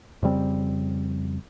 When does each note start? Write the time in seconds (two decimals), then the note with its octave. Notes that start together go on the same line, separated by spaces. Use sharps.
0.23 F2 C#3 G3 C4